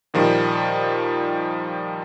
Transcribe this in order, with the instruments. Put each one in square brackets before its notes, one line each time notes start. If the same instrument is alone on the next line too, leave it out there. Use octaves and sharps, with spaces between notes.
[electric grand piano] A#2 D#3 F3 G3